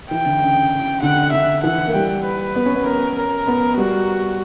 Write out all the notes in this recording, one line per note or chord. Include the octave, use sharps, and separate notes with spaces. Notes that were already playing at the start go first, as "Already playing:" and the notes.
E3 G5
D3
C#3
D3 F#5
D3 E5
E3 F#5
A#3
G3 G5
B4
B3
C#4
B3
C#4 A#4
A#4
B3
G3 F#4